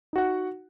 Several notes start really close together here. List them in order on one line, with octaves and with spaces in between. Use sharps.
D#4 F#4 F#5